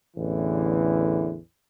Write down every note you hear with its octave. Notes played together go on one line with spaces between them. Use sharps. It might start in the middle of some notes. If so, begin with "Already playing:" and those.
A1 E2 D3 E3